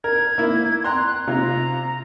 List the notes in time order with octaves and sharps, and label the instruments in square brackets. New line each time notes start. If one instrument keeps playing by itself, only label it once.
[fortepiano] A#4 [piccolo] G#6
[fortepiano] A#3 E4
[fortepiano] G5 A#5 C6 [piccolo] F#6
[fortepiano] C3 F4 [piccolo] A#5